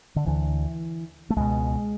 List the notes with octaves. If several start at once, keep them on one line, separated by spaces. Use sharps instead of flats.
D3
D2 D3 E3
A3
C#2 B2 G#3